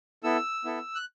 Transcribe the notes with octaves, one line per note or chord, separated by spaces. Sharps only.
B3 E4 A4 E6
B3 E4 A4
F#6